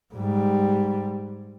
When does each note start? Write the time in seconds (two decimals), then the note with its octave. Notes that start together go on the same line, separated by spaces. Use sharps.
0.14 G#2 G3